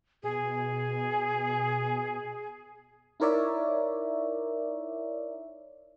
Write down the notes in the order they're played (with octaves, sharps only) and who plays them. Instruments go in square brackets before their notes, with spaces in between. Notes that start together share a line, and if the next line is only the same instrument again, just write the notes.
[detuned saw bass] B2 [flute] G#4
[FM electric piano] D#4 E4 A#4 C#5 D5 E5